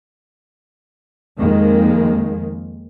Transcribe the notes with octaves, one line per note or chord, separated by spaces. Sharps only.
F2 D#3 G#3 A#3